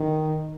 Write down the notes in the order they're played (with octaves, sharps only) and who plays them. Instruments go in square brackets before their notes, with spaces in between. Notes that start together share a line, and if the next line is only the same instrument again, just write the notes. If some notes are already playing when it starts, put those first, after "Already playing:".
Already playing: [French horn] D#3